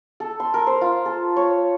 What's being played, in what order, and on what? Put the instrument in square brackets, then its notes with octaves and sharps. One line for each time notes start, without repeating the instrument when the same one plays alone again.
[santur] A4
C6
A#4
C5
F4
A4
C#5